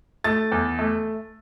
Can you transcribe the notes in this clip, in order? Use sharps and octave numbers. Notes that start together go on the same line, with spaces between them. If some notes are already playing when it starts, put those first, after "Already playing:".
A3 A6
E2
A3